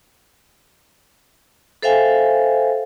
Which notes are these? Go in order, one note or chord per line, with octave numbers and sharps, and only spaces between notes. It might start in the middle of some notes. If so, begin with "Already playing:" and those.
A4 C5 E5 F5 G5 G#5